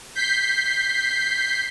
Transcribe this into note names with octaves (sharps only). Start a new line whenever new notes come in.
G6 B6 C7